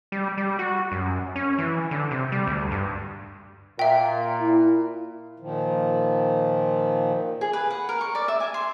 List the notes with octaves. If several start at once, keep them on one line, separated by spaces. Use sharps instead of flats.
G3
G3
F#4
F#2
C#4
E3
D3
C3
G3
D2
G2
A#2 E5 G5
E4
A#2 D#3 F3
G#4
B4
F#5
A#4
C#6
D5
E5
G#5
C6